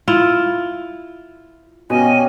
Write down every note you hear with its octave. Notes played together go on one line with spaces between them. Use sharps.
E4 F4
B2 G3 C#4 D#5 F5 G#5